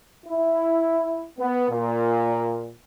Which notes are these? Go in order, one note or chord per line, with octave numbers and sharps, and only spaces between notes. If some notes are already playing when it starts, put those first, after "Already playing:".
E4
B3
A#2